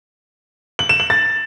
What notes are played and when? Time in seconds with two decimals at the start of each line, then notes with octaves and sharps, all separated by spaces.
0.79 F#7
0.89 E7
1.00 F#7
1.10 A6